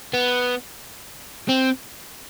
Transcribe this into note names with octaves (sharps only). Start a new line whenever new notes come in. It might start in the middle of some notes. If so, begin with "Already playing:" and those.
B3
C4